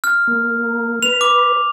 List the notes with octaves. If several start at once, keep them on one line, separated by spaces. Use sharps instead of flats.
F6
A#3
B4 F7
D6